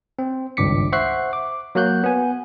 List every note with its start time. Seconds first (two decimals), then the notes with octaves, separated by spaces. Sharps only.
0.19 C4
0.57 G#1 C#2 G2 D6 B6 C#7
0.92 C5 E5 F#5 C#6 F#6 C7
1.33 D6
1.75 F#3 A#3 F#4 F#6 G6
2.04 B3 G#5